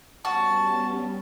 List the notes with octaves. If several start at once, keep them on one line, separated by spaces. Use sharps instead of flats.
G3 B3 C#4 F#4 A5